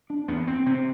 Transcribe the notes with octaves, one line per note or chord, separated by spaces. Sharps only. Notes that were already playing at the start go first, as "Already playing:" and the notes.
D4
E2 B3
C4
C3 C4